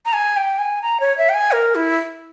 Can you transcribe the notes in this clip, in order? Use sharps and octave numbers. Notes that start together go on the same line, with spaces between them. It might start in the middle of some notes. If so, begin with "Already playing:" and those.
A#5
G#5
G5
G#5
A#5
C#5
E5
G5
G#5
A#4
E4